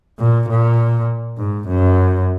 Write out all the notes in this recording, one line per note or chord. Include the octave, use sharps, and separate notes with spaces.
A#2
A#2
G#2
F#2